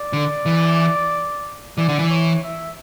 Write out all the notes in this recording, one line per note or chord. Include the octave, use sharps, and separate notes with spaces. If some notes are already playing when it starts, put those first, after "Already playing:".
Already playing: D5
D3
E3
E3 D5
D3
E3
C#5
E5